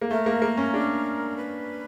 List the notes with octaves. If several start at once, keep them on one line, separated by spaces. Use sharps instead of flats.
A#3
A3 A#4
A#3
A#3
C#4
D4
B4